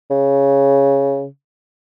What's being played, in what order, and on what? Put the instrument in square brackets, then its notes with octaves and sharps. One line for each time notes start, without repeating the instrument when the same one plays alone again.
[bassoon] C#3